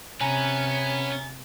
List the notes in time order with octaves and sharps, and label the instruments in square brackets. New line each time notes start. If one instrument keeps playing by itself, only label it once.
[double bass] C3 [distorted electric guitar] B3 B4 [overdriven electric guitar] C#4 [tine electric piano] G#5 A#5